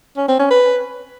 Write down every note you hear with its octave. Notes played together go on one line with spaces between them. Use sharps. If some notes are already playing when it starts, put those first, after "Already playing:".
C#4
C4
C#4
B4